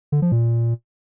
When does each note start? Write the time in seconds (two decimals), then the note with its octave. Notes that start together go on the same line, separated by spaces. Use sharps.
0.12 D3
0.22 F3
0.32 A#2